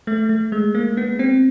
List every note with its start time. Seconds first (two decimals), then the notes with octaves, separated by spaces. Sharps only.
0.07 A3
0.29 A3
0.52 G#3
0.75 A#3
0.97 B3
1.19 C4